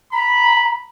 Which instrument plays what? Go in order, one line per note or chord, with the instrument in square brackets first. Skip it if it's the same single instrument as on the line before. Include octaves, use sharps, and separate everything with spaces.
[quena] A#5 [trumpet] B5